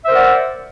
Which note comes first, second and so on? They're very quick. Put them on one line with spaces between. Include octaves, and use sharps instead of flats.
E5 C5 A#4 F#5 D5